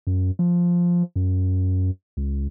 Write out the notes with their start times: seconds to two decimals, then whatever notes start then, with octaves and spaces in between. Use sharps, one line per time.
0.07 F#2
0.39 F3
1.16 F#2
2.17 C#2